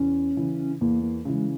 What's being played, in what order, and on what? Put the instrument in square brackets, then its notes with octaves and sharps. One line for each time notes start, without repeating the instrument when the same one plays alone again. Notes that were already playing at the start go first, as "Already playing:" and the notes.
Already playing: [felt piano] E2 [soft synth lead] C#4
[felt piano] C#3 E3
[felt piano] E2 [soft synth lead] A#3
[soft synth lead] A#3
[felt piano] C#3 E3 [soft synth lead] G#3